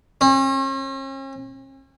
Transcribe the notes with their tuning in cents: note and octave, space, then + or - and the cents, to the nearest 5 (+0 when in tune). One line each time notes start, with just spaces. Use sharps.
C#4 -45